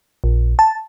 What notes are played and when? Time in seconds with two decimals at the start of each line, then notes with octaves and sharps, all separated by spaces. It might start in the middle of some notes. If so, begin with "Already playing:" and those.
0.24 A#1
0.59 A5